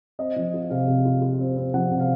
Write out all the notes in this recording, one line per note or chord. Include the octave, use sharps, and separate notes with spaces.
C4 D#5
F3
F4
C3 F5
C3
F4
F4
C4
C4
F3 F#5
C3
F5